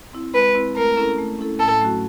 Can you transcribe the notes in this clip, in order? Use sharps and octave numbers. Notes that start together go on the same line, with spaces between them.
C4 E4
G#3 B4
C4 E4
A3 A#4
C#4 E4 A4
A3
C#4 E4 A4
A2 A4
F#3 A3 C#4 F#4